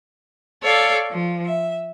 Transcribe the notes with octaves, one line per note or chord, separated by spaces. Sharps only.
A4 C#5 D5 F5
F3
E5